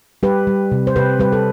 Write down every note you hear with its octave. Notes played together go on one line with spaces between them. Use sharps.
G3 G4 B4
G3
C3
C5
C3 G4 B4
G3 G4 B4
A4